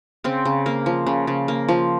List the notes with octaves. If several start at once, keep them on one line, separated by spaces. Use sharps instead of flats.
C#3 C4
C#3
A#3
F3
C#3
C#3
A#3
F3